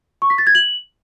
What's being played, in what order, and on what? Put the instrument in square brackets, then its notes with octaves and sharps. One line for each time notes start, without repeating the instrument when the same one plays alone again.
[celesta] C#6
B6
A6
G#6
F#7